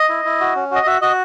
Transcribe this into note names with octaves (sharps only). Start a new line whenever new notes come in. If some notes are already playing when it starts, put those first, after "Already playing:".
Already playing: D#5
E4
E4
F#4
C#4
F#4 D#5
F#4 E5
F#4 D#5